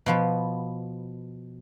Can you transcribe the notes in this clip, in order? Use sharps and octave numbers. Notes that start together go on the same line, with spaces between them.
B2 F3 B3